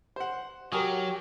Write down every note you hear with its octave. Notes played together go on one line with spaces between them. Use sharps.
C5 F#5
F#3 G4 A#4 G#5 D#6